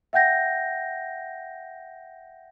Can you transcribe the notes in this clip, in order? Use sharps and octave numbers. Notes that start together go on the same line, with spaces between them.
E5 F#5 G5 G6 A#6